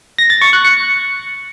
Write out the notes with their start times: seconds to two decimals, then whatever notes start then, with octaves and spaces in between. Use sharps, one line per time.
0.18 A#6
0.30 A6
0.42 C#6
0.53 F#6
0.65 C#7